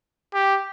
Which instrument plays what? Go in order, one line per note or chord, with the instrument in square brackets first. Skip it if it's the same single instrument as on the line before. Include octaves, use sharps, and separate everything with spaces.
[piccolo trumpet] G4